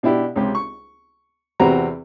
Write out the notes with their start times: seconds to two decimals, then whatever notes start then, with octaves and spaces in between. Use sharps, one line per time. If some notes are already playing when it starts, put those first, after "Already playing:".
0.03 B2 D4 E4 G4
0.36 C#2 C3 G4
0.55 C#6
1.60 E2 C3 C4 F#4 B4 A#5